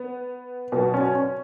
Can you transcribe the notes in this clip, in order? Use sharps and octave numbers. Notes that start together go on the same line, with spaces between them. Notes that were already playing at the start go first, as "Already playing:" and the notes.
Already playing: B3
B2 F#3 B3
C#4
C#4